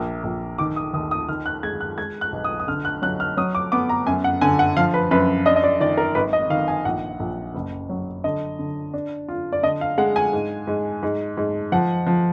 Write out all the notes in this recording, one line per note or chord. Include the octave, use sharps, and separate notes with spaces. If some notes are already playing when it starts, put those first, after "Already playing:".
Already playing: A#1 A#3
A#1
D#3 D6
D#6
D#2 D#6
D#6
D#3 F6
F#6
G#3 G#6
F#6
G#3 G#6
F#6
B1
D#6
D#6
D3 F6
F#6
F#3 F#6
F6
F#3 D#6
D6
B3 D6
A#5
F#2 G#5
F#5
D3 G#5
F#5
F3 F5
B4
F#2 B4
D4 D#5
D#5
D5
D#3 D5
A#4
G#1 B4
D#5
D#3 F5
G#5
A#1 F#5
A#1
F#1
F#3
D3 D#5
D3
D4
F4
D5
D3 D#5
F5
G#3 F#5
G#5
G#2
G#2
G#2
G#2
F3 F#5
F3